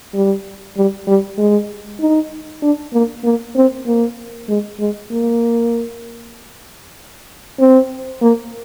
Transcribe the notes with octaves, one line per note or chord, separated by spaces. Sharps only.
G3
G3
G3
G#3
D#4
D4
A#3
A#3
C4
A#3
G#3
G#3
A#3
C4
A#3